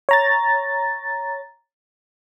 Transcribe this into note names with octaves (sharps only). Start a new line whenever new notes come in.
C#5 A#5 A6